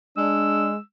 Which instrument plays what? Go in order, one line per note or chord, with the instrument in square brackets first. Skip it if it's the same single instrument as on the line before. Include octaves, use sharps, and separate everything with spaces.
[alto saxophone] G#3 [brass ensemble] D4 [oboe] E6